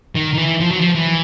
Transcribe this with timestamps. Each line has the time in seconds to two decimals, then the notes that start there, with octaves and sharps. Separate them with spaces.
0.15 D#3
0.34 D#3
0.38 E3
0.61 F3
0.71 F#3
0.80 F3
0.95 E3